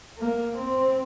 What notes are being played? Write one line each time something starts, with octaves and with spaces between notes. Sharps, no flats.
A#3
C4